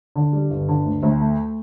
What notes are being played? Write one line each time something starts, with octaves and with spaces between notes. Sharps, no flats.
D3
G3
G1
D3
D2
D2
A3